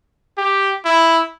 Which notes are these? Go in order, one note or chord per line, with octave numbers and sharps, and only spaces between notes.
G4
E4